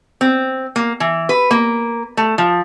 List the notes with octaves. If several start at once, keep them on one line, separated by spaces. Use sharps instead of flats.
C4
A#3
E3
B4
A#3
A3
F3